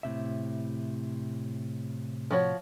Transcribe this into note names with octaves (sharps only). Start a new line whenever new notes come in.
A2 C3 E5
F3 F#4 C#5